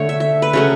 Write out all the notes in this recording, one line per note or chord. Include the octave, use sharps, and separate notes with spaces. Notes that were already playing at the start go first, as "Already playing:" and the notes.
Already playing: D3 A3 C#5
E5
E5
B4
C#3 F#3 A3